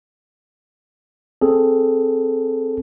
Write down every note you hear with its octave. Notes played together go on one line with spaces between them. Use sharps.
C4 G#4 A4